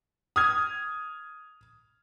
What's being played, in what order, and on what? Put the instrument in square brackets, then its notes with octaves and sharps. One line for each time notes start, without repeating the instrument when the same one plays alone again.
[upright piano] D#6 F6 G#6